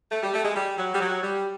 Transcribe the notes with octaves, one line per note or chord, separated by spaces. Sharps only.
A3
G3
A3
G#3
G3
F#3
G3
F#3
G3